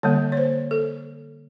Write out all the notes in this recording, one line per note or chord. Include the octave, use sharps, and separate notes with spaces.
D3 G3 A#3 C#5
C#5
C5
A4